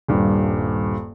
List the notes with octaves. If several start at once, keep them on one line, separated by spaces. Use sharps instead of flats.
D#1 G2